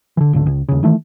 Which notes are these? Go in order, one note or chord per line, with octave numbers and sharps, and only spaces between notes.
D3 E3
G#1 C#2 D3
C#2
D#2 C#3
D#3 E3 A3